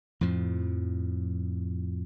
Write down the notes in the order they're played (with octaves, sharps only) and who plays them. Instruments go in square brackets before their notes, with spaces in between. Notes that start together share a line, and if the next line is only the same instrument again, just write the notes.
[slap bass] F2 A2 F3